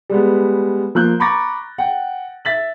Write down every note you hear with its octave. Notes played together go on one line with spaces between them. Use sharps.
G3 G#3 B3
F3 A#3 F#6 G6
A#5 B5 C#6 D6 A6 A#6
F#5 G5
E5 A6 B6 F#7